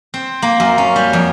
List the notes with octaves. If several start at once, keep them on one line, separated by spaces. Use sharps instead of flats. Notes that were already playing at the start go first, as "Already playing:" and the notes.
C4
A#3
F#2
C#4
G3
F2